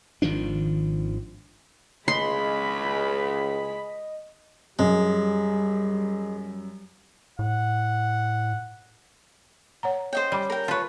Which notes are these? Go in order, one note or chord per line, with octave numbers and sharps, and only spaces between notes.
G#1 D#3 F3 D4
C#2 G#3 D#5 B5 C6
F#2 G3 G#3
A2 F#5
C#5 F#5 A#5
C#4 C5 D#5 G5
G3 B5 D6
A#4 G5
F4 B4 C#5 A5